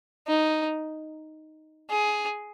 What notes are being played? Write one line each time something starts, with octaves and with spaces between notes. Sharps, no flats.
D#4
G#4